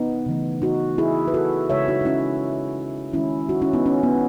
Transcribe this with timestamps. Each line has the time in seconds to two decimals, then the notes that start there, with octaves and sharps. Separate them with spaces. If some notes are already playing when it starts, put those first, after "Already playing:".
Already playing: B3 D#4
0.26 C#3 E3 A3
0.62 D#4 F#4
0.98 E4 G#4
1.28 B4
1.34 F#4 A4
1.70 C#3 G#3 C#5 E5
1.88 D#4 F#4
2.01 D#4
2.05 C#4 E4
3.13 D#3 G#3 C#4 E4
3.49 D#4 F#4
3.62 C#4 E4
3.73 B3 D#4
3.86 C#4
4.03 B3